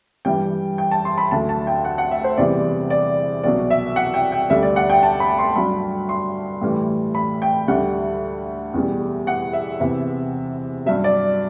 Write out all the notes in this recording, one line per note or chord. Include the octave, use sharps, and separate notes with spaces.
G2 E3 G3 G5
G5
A5
C6
B5
D2 D3 F#3 A5
A5
G5
F#5
F#5
E5
C5
E2 C3 E3 G3 D5
D5
C2 B2 F#3 D5
E5
F#5
G5
G5
D2 D3 G3 E5
D5
F#5
G5
A5
B5
C6
G2 F#3 B5
C6
A2 E3 G3
B5
G5
D2 D3 G3 F#5
E2 B2 G3
F#5
E5
E2 C3 E3
G2 F#3 E5
D5